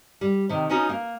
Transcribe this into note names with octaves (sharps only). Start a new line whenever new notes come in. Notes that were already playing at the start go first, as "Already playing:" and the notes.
G3
C3 D#3
B3 C#4 D#4 F#4
A#3